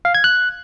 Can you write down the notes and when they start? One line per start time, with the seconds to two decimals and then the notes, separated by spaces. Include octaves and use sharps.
0.05 F5
0.15 G#6
0.24 F#6